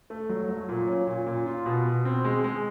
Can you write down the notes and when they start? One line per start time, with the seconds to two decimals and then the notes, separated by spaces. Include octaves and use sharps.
0.10 A3
0.29 F#3
0.49 F#3
0.69 A#2
0.88 C#4
1.07 A#2
1.27 A#2
1.46 F4
1.66 B2
1.86 B2
2.05 C4
2.24 G#3
2.44 G#3